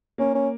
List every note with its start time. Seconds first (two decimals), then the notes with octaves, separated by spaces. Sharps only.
0.18 A#3 C#4
0.35 C#4